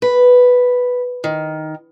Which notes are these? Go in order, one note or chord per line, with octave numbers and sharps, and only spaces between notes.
B4
D#3